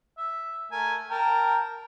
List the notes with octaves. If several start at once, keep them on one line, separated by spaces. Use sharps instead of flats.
E5
A3 A#4 G#5
A#4 G5 A5